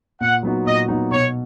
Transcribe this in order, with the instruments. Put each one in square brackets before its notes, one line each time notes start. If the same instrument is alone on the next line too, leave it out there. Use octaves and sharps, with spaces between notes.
[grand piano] A#2 [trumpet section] F#5
[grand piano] F#3 B3 D#4 F#4
[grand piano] A#2 [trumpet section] D#5
[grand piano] F#3 B3 D#4 F#4
[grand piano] B2 [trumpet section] C#5